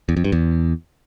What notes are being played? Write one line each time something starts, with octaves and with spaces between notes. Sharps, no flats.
E2
F2
G2
E2